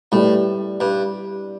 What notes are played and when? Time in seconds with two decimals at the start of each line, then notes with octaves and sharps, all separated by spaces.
0.12 A2 G3 E4 G4 B4 D5
0.80 G2